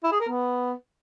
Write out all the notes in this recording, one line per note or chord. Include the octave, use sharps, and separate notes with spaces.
E4
G#4
A#4
B3